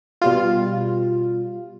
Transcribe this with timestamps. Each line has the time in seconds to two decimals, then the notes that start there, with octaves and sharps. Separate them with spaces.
0.22 B2 G3 F4